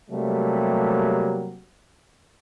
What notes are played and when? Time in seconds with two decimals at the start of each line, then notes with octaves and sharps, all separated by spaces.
0.10 C3 F#3 G3 A3 A#3